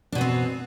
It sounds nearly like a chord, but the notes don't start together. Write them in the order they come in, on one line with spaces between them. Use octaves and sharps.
D4 B2 B3 C4